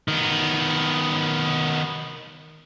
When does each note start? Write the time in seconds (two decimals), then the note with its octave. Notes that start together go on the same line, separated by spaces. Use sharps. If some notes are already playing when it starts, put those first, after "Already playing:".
0.08 D#3 B3